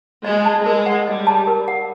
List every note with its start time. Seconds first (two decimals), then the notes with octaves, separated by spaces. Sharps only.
0.25 G#3 D#5
0.45 A5
0.66 G#3 A#4
0.86 F#5
1.07 G3 D#5
1.27 A5
1.47 A#4
1.68 F#5